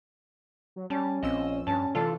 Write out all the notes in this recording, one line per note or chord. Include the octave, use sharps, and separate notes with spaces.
F#3
G3 C#4 A5
A#1 F3 C4 D#5 E6
G2 C#4 A5
C3 E3 A3 D4 F4 A4